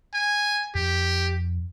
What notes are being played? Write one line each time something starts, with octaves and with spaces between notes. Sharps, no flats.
G#5
F2 G4